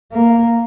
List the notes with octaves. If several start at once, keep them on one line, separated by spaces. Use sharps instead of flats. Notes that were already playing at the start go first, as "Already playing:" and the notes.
A#3